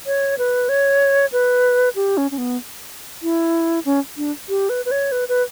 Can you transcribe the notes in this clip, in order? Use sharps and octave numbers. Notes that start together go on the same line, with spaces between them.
C#5
B4
C#5
B4
G4
C#4
C#4
B3
E4
C#4
D4
G4
B4
B4
C#5
B4
B4